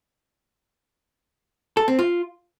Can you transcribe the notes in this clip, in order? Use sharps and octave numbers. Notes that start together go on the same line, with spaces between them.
A4
C4
F4